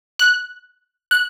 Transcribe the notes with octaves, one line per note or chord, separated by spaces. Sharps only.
F#6
F#6